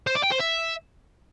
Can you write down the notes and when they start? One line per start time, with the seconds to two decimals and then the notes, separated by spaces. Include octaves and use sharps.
0.07 C5
0.15 D5
0.24 G5
0.32 C5
0.40 E5